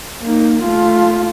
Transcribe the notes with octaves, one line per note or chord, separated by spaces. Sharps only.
A#3 D#4
A3 F4